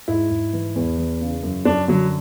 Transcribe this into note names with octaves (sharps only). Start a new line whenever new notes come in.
G#2 E4
G#2
E3
E2
E3
C#3
F#2
F#2 D4
D3 F#3